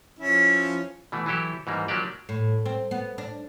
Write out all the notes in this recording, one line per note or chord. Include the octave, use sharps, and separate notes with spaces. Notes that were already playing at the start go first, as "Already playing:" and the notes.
F3 C#4 E4
B2 E3 A3
E3 F#3 E4 G4 A4
G#2 E3 G3 A#3
F3 F#3 A#3 D4 G4 D5
A2
C4
B3
D4